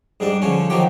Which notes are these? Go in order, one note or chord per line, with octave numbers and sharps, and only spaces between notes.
G#2 G3 D4
D3 F3 C#4
D#3 F3 F#3 G4